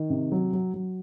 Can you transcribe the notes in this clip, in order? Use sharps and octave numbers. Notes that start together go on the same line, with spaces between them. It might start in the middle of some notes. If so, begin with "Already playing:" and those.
Already playing: D#3
C3
F#3
F#3
F#3